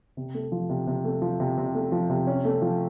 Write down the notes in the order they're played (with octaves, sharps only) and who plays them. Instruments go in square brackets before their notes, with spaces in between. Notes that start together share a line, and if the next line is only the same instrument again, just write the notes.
[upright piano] C3
A3
F3
C3
C3
A3
F3
C3
C3
A3
F3
C3
C#4
A3
F3